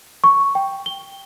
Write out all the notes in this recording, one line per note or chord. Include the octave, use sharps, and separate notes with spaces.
C#6
G5
G7